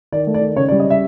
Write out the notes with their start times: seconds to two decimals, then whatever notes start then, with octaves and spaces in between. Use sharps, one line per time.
0.12 D#3 D5
0.27 A3
0.34 D5
0.41 D#3
0.56 C#3 C#5
0.69 D5
0.72 G3
0.80 D#5
0.87 C#3 E5